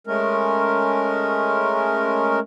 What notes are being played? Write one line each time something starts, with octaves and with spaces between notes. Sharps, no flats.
G#3 A3 C#4 A#4